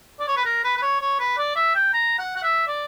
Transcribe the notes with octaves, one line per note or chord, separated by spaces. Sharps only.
D5
C#5
B4
A#4
B4
B4
C#5
C#5
B4
D5
E5
G5
A#5
F#5
F#5
E5
D5